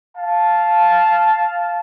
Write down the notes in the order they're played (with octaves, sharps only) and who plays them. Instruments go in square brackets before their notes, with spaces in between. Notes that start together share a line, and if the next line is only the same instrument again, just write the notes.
[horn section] F5 A5